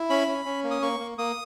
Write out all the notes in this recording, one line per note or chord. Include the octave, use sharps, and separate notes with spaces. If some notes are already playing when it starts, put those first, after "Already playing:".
Already playing: E4
C#4 B5
C#4
C#4
A#3
D#6
A#3 C#6
A#3
A#3 D#6